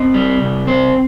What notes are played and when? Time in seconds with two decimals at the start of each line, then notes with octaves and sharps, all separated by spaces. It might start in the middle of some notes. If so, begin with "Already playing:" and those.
Already playing: C4 D#5
0.14 G3
0.41 C2
0.67 C4 C5